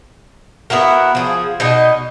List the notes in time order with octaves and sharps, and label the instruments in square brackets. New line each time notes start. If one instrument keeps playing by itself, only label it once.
[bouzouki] B3 E4 F#4 A#4
F3 G#4
B2 D#4 D#5